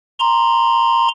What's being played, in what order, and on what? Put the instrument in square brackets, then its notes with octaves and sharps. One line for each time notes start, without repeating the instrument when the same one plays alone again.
[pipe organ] A#5 C6